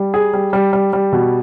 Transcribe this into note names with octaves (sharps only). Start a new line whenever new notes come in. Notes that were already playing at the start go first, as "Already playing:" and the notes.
Already playing: G3
G#4
G3
G3
G3
G3
B2